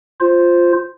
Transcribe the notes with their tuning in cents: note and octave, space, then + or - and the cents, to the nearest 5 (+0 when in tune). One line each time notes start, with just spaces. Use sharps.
F4 +0 C5 +0